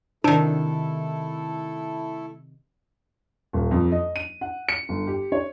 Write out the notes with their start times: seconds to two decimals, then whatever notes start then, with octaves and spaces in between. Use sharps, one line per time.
0.24 C3 D#3 A3 D4 E4 A4
3.53 D#1
3.71 F2
3.92 D#5
4.16 D#7
4.41 F#5
4.69 C#7
4.89 G1
5.07 G4
5.32 C#5